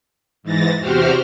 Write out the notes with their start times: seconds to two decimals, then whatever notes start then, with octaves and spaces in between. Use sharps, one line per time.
0.43 G#2 E3 A6 A#6
0.79 E2 C3 F#4 G4 C5 F6